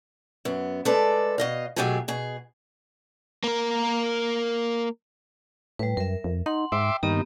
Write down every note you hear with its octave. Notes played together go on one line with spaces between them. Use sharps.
F#2 B3
G#3 A3 A4 B4 D5
B2 D#5 F5
B2 F#3 A3 G4 G#4 G#5
B2 G#4
A#3 A#4
A2 G3 B4
F#2 A#4 E5
F2
D#4 F#5 C6
G#2 E5 G5 C6 D6
G2 D#3 A#3 B3 G4